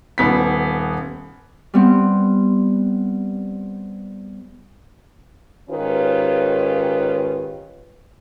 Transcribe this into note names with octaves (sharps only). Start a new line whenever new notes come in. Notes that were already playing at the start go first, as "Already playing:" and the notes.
D#1 B3 B6
G3 B3 C4
G#2 D#3 C#4 F4 G4 B4